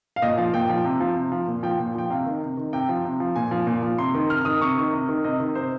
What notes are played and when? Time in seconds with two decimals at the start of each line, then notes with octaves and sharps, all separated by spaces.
0.16 F5
0.22 A#2 D#5
0.38 F3 F5
0.53 A#2 G5
0.69 F3
0.85 C3
1.00 F3
1.16 C3
1.32 F3
1.48 A#2
1.63 F3 G5
1.79 A#2
1.95 F3 G5
2.10 C3 F5
2.26 D#3
2.42 C3
2.57 D#3
2.73 C3 G5
2.89 F3
3.05 C3
3.20 F3
3.36 A#2 G#5
3.51 F3
3.67 A#2
3.82 F3
3.98 C3 C6
4.15 D#3
4.30 C3 F6
4.41 F6
4.45 D#3 D#6
4.61 C3 C#6
4.77 D#3
4.93 C3
5.09 D#3
5.24 C3 D#5
5.40 D#3
5.55 C3 C5